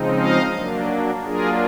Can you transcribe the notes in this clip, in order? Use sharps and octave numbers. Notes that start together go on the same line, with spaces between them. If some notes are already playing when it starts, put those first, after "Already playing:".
Already playing: C#3 F3 G#3 C4 D#4
D#5 F5
F#3 A#3 D4
F#3 A#3 D4 F4 G#4 A#4